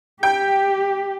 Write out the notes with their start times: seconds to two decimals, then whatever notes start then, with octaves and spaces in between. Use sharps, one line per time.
0.23 G4 G5